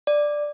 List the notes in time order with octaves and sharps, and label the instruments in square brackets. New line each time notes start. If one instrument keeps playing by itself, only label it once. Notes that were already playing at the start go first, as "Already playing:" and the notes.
[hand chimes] D5